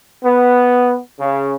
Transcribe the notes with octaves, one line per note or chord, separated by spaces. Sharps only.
B3
C#3